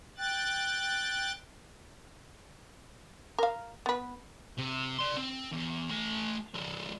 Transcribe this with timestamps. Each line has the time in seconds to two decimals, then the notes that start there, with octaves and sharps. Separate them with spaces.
0.18 G5 F#6 A6
3.38 A#4 F5
3.86 B3 B4
4.58 C3
4.99 D5 C6
5.17 C4
5.53 E2
5.90 A3 G#5
6.54 F3 G#3